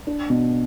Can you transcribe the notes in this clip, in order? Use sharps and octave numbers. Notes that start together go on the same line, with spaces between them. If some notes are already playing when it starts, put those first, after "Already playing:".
D4
B2